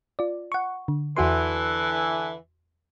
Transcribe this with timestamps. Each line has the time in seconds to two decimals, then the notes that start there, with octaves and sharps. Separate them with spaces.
0.19 F4 D5
0.52 F#5 C#6
0.88 D3
1.16 E2 D3 E3 F#4 C6